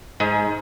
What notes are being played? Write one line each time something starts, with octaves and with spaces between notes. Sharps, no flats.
G#2